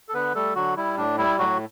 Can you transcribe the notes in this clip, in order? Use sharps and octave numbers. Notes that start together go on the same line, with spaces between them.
A4
D3 B3 B4
G3 A3 A4
D3 F#3 F#4
G3 E4
A2 D4
G3 E4
A2 F#3 F#4